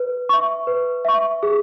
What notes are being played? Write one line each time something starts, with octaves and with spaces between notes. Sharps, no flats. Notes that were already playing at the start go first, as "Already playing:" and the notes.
Already playing: B4
E5 C#6
B4
E5 C#6
G#4